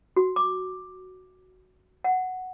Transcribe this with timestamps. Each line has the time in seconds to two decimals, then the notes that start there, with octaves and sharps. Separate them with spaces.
0.16 F#4
0.36 D6
2.04 F#5